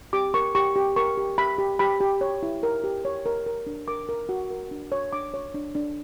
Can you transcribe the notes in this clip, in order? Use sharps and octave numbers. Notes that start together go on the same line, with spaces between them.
G4 D6
A#4 C#6
G4 C#6
G4
A#4 C#6
G4
G4 B5
G4
G4 B5
G4
C#5
E4
A#4
G4
C#5
A#4
A#4
D4
A#4 D6
A#4
F#4
A#4
D4
C#5
D4 D6
C#5
D4
D4